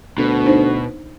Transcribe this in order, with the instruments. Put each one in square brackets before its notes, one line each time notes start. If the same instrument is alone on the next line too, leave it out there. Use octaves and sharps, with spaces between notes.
[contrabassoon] D2 [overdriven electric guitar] B2
[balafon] D4 D#4 C5